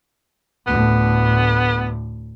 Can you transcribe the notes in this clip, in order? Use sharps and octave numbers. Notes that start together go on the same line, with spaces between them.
D2 A2 B3